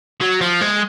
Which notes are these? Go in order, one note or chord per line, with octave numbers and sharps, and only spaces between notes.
F#3
F3
G#3